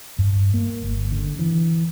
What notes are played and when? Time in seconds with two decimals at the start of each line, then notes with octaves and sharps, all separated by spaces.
0.19 G2
0.54 A#3
0.83 G1
1.12 D3
1.39 E3